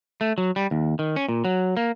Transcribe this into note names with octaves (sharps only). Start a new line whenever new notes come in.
A3
F#3
G3
D#2
D#3
C#4
A#2
F#3
A#3